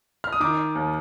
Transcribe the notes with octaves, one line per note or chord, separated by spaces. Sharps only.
F6
D#6
D#3 D6
D#2